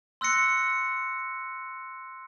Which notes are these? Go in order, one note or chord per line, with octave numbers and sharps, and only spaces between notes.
C6 E6 F#6 A#6 C#7